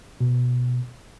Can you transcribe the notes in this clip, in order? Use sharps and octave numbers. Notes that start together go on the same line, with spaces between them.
B2